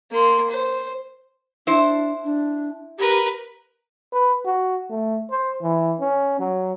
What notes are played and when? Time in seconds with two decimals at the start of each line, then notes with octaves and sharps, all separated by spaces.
0.12 A#3 C6
0.50 C5
1.67 D4 E4 C5
2.25 D4
2.98 G4 A#4 B4
4.12 B4
4.45 F#4
4.90 A3
5.30 C5
5.62 E3
6.00 C#4
6.39 F#3